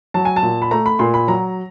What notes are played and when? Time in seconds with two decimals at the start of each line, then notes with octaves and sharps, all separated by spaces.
0.14 F#3 A5
0.25 G#5
0.36 A5
0.43 A#2
0.62 B5
0.71 A3 A#5
0.86 B5
0.99 A#2 C6
1.14 B5
1.28 F#3 A#5